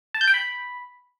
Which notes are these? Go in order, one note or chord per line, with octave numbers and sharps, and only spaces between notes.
A5
G6
G5
B5